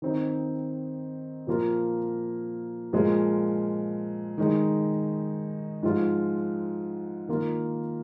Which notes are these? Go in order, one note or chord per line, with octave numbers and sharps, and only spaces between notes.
D#3 C4 D#4
A#2 F3 A#3 F4
A#2 F3 G#3 F4
D#3 G#3 D#4
G#2 F3 G#3 F4
D#3 A#3 F4